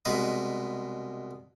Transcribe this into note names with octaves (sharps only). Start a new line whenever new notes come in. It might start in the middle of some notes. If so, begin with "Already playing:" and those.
C2 B2 G#3 B4 A#5 D#6